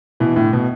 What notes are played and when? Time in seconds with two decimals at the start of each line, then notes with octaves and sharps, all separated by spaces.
0.20 B2 E3
0.36 A2 D3
0.53 B2